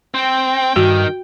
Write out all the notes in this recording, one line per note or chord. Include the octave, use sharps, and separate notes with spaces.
C4 G5
G2 D#3 F#4